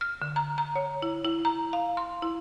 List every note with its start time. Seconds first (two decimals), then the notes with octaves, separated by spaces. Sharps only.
0.01 F6
0.22 D3
0.36 A#5
0.58 A#5
0.76 C#5
1.02 E4
1.25 E4
1.45 A#5
1.73 F5
1.97 C6
2.22 E4